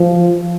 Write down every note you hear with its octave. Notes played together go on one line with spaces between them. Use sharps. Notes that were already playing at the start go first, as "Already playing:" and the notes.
Already playing: F3